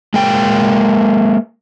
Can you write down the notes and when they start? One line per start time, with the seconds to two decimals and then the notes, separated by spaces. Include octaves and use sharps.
0.14 G#3 A#3 G5